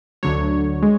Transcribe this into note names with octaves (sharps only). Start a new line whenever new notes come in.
D2 D3 F#3 C#5
G#3